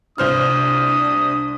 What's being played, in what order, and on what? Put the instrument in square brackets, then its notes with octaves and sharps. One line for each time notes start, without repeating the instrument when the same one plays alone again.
[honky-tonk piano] C2 C5 F6 [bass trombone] D4 [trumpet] D#6